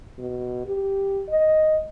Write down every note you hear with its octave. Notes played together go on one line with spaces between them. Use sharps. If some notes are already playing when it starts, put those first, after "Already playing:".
B2
G4
D#5